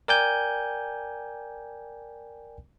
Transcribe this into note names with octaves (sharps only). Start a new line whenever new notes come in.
A#4 D5 G5 G#5 G6